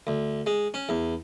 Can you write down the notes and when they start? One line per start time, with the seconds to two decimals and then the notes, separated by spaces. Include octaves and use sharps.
0.07 D2
0.46 G#3
0.74 C#4
0.89 E2